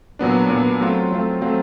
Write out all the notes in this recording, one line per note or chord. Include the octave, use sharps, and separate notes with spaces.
A#2 F#3 B3 D4
A#2 F#3 B3 D4
F#3 A3 C4 F4
F#3 A3 C4 F4
F#3 A3 C4 F4